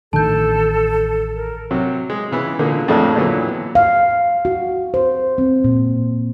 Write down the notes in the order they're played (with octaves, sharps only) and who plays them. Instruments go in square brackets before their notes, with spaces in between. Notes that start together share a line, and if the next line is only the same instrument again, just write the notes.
[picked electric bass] A1 D#3 D4 [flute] A4 [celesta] A5 G6
[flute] A#4
[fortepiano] C3 F#3
G#3
C#3 E3 B3
A#2 D3 G#3 A#3
F2 A2 G#3 A3 D4 E6
A#2 D3 E3 F#3 B3
[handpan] F5
F#4
C5
C4
A#2